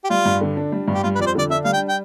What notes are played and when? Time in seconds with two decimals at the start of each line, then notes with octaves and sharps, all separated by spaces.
0.04 G4
0.10 G3 F4
0.25 G2
0.41 D3
0.57 D4
0.72 G3
0.88 G2
0.94 G4
1.03 G3 F4
1.15 B4
1.19 F2 D5
1.26 C5
1.35 D3 D5
1.50 D4 E5
1.64 G3 F5
1.73 G5
1.89 G5